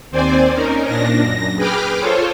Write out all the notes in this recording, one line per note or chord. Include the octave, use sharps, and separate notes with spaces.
D#2 C4 C5 D5 G#5
C#4 D#4 A#4
A#2 D4 A#6
F#2 A#6
G#4 B4 G5 B5 D6 F6
F4 A4 C5 C#5